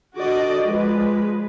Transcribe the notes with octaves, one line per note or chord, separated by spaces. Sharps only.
D3 F#4 D5 D#5
F3 G#3 B4